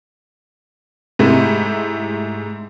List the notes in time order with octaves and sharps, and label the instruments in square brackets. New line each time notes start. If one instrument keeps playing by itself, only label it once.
[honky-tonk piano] G#2 C3 A3 E4